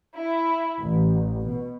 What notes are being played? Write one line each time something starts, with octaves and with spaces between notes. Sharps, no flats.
E4
A1
B2